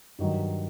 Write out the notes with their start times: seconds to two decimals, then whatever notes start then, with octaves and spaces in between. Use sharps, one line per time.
0.18 G2 D#3 F#3